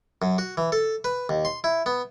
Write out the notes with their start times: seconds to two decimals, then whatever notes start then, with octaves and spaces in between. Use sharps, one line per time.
0.22 F#2
0.38 F#4
0.57 E3
0.72 A4
1.04 B4
1.29 D#2
1.45 C6
1.64 E4
1.86 B3